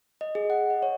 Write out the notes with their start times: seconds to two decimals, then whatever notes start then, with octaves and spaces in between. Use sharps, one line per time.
0.21 D#5
0.35 G#4
0.50 F#5
0.70 D#5
0.82 C#5